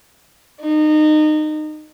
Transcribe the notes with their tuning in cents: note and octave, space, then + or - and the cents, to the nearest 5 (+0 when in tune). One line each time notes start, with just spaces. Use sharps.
D#4 -25